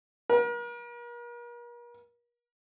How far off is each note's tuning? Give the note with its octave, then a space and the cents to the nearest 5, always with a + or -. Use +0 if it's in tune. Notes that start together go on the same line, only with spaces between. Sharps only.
A#4 +40